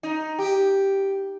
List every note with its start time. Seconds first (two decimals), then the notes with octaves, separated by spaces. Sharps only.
0.03 D#4
0.39 G4